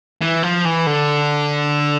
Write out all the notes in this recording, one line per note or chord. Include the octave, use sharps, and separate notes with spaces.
E3
F3
E3
D3